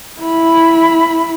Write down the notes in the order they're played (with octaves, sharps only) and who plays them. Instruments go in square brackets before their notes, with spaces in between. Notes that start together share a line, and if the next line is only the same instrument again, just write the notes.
[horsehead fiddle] E4 B5